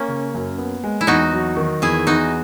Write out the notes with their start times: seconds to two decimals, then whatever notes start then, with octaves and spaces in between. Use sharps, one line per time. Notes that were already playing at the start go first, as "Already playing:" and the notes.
Already playing: A#3 C#4
0.08 C#3
0.34 F#2
0.58 B3
0.83 G#3
1.01 E4
1.07 E2 D#4 F#4
1.33 F#3
1.57 D#3
1.82 E2 E4 G#4
2.07 E2 D#4 F#4